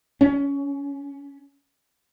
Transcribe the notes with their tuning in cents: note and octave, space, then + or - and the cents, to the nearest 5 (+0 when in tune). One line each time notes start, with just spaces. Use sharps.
C#4 +20